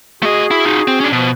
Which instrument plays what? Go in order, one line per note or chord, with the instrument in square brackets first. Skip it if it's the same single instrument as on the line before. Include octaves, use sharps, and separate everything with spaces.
[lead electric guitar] A3 D#5 [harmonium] F#4 G#4
[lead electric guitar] E4
D#4 F4
C4
C#4 D4
[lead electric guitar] B2 [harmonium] F3